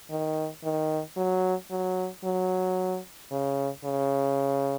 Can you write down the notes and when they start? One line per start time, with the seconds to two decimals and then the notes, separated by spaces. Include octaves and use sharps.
0.10 D#3
0.64 D#3
1.17 F#3
1.71 F#3
2.24 F#3
3.32 C#3
3.85 C#3